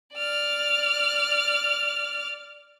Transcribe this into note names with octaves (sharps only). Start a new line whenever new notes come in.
D5 F6